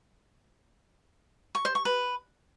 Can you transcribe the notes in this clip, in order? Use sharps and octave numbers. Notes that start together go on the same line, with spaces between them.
C#6
C5
C#6
B4